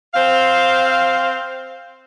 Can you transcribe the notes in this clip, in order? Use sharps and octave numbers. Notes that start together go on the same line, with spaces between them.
C4 C5 F5